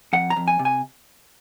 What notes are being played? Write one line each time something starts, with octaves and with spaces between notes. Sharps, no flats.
F2 F#5
A#5
F2
G#5
C3
G#5